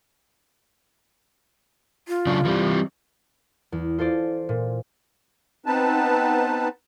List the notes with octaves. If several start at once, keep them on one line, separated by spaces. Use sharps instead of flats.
F4
C#3 F#3 D4
E3 G3 C4
E2
F4 A4 C5 D5
A#2
B3 C4 D#4 B4 A5